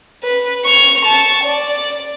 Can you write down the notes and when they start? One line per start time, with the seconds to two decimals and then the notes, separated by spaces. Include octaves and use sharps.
0.24 B4
0.65 C#6 F7
1.05 A5 C#6
1.44 D5